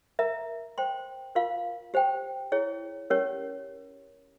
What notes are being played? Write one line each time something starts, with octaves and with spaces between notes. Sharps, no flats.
A#4 E5 A#5
C5 G5 C6
F4 A#4 F5 C6
G4 C5 G5
E4 G#4 C#5
C#4 G4 A#4 C#5